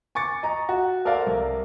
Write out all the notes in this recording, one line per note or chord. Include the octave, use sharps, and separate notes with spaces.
G#5 C#6 D6 A6 C#7
D#5 A#5 A6
F#4
A4 A#4 C5 D5 F5 F#5
C2 A#4